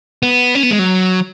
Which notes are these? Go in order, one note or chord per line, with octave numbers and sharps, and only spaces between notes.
B3
C#4
B3
G#3
F#3